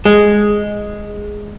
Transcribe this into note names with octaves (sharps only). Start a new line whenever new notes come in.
G#3